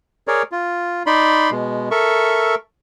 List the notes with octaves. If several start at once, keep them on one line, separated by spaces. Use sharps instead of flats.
G#4 A#4 C#5 D5
F4
D#4 D5 B5 C6
B2 G#3
A4 A#4 E5 C#6